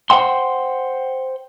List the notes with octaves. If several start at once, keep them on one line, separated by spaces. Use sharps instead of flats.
C5 F#5 G5 C6